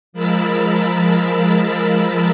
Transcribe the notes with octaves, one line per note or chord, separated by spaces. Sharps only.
F3 G#3 A#4 B5 E6 A6